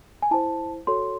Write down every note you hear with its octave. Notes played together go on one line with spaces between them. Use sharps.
G#5
E4 C5 A5
F#4 A4 C#5 C6